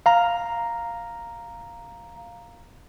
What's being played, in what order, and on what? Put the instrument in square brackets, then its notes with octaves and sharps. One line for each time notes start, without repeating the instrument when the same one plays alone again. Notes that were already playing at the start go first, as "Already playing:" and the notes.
[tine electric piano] F5 A#5